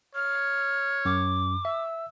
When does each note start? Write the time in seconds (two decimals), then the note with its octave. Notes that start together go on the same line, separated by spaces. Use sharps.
0.15 C#5 F6
1.05 F#2 D6
1.65 E5 E6